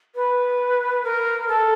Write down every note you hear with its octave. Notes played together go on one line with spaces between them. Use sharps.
B4
A#4
A4